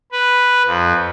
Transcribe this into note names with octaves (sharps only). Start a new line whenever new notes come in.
B4
F2